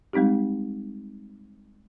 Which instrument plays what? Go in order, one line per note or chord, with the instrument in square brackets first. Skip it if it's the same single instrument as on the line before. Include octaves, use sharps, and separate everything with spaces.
[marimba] G3 G#3 C4 D#4 G4